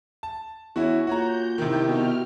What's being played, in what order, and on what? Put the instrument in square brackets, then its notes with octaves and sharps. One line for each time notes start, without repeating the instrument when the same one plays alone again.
[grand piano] A5
[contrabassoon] E2 [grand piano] C#4 E4 F#4
[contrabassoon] A#2 [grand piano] F#4 C#5 A#5 [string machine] G6
[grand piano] C3 D#3 [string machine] D#4 E4 G4
[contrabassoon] B2 [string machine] F6